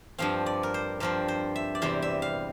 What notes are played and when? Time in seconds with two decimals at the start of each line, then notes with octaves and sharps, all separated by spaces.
0.18 G2 F3 C4 F5
0.46 D5
0.63 A#4
0.74 C5
1.00 G2 F3 C4 A#4
1.28 C5
1.56 E5
1.75 D5
1.82 E2 C3 G3 C4 C5
2.02 E5
2.22 F5